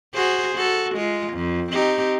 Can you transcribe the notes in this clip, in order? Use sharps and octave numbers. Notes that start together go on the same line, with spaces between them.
F#4 G#4 C5
F#4 A4
G#3 F4
F2
C4 D#4 G4